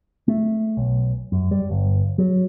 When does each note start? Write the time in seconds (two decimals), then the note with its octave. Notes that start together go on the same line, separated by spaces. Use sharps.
0.28 A3
0.77 B1
1.32 F#2
1.51 G3
1.70 G1
2.18 F#3